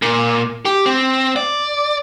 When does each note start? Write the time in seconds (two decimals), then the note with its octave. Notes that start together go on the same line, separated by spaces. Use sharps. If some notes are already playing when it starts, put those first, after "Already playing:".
0.02 A#2
0.65 G4
0.86 C4
1.36 D5